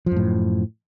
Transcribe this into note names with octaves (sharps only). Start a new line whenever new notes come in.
F#2 A2 F3